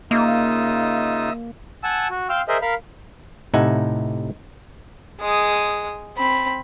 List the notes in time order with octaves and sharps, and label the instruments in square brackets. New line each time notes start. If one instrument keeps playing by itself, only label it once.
[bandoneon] C#3 D#4 F4 [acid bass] A#3 [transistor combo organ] D#5 E5
[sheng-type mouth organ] F#5 G#5 A5 E6
F#4
F5 G5 C6 E6 F6
G#4 A#4 C5 D#5 E5
A#4 F5 B5
[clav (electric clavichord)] A2 C3 D#4 E5 F#5 G#5
[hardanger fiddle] G#3 D#6
C4 B5